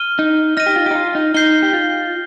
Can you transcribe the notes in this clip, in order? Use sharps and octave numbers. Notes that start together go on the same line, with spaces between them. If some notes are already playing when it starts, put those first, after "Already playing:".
Already playing: F6 D#7 G7
D#4
D#4 F6 A#6 D#7
G4
F4
G4
D#4
F4
D#4
D#4 G6 C7 G7
G4
F4